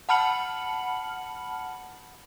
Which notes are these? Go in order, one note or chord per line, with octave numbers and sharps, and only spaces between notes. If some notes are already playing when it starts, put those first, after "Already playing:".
F#5 A5 B5 F6 C#7 F#7